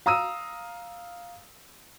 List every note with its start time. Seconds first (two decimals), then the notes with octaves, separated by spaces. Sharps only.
0.06 F5 A#5 D#6 E6 D#7